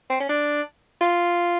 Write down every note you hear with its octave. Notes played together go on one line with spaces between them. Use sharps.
C4
C#4
D4
F4